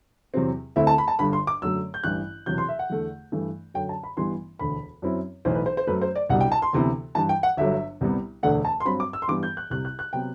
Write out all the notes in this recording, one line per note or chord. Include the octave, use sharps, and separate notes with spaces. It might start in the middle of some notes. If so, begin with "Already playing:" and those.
E2 C3 F#3 C4
D2 D3 A3 C4 E4 E5
A5
B5
A5
G1 G2 D3 B5
C6
D6
F#2 D3 F#3 A3 E6
G6
A1 G2 E3 F#6
E1 E2 C3 F#3 G6
C6
E5
F#5
E2 D3 A3
G2 E3 A3
F#2 D3 F#3 G5
A5
B5
A1 G2 E3 G3 B3 C6
E1 D2 D3 B5
F#2 F#3 C4 E4
B1 A2 E3 C5
B4
C5
C5
F#2 F#3 A3 B4
C5
D5
C2 B2 G3 D4 F#5
G5
A5
C6
D2 C3 E3 B3 E4
G2 E3 G3 A5
G5
F#5
G1 G2 D3 F#3 E5
C2 C3 G3 B3
E1 D2 D3 A3 D4 F#5
A5
C6
G2 F#3 C4 B5
D6
E6
C6
G2 E3 G3 B3 D6
G6
F#6
C2 C3 G3 F#6
F#6
F#6
C3 F#3 B3 G5